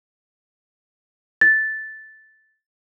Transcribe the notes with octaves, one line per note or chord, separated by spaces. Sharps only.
A6